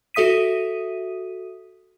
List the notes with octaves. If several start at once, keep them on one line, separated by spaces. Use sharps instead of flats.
F#4 A4 E5 D#6 B6 D#7